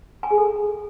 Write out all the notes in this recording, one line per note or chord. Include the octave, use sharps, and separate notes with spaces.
G#5
G#4
A4